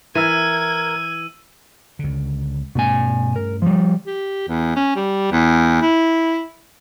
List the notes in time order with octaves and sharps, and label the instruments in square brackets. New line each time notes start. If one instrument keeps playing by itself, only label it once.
[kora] E3 [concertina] A#4 [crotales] E6 D#7 [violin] G#6
[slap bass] C#2 D3
[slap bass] G2 A3 C#4 [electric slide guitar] B2 G#5
[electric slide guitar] A#4
F3 G3
[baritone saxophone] G4
E2
C#4
G3
E2
E4